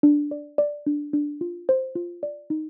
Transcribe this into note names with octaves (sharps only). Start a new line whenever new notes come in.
D4
D5
D5
D4
D4
F4
C5
F4
D5
D#4